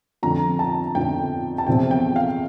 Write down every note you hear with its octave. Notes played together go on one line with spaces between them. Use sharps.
F2 D3 F3 A#5
A5
F2 D3 F3 G5
A5
E2 C3 F3 C4 G5
G5
F5